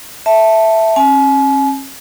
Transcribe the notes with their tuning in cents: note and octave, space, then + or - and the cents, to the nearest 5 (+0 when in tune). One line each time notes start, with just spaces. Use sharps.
E5 +0 A5 +0
C#4 -40 G#5 +40